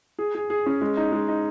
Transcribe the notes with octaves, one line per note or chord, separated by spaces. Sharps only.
G#4
G#4
G#4
C#4
G#3
D#4
G#3
D#4